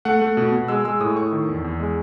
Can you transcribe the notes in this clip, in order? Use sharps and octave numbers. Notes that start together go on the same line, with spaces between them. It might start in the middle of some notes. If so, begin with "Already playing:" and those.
A3 F#5
A3
B2
B2
G#3 E6
G#3 E6
A2 D#6
A2 C#6
D#3
E2
E2
G#3